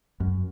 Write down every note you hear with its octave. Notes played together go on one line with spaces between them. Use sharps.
F#2